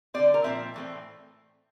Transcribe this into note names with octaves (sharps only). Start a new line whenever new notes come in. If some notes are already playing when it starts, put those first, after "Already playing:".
D3 G3 C4 D5
A#4
A#2 F3 C4 E5
A2 E3 A3 C4